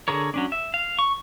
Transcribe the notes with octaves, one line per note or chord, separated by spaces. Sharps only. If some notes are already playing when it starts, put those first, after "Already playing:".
D3 G#4 A#4 C#5
F#3 C#4 D4
E5
F5
C#6